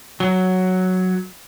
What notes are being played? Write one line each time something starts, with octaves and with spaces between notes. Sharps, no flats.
F#3